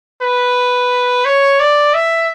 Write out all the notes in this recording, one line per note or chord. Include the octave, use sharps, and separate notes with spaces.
B4
C#5
D5
E5